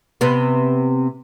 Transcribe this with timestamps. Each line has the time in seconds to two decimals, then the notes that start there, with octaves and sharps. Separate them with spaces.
0.21 C3 B3